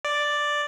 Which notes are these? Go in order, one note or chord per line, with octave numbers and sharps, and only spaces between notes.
D5